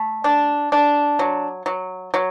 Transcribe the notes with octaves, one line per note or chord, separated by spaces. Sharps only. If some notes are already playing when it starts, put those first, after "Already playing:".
Already playing: A3
D4
D4
F#3
F#3
F#3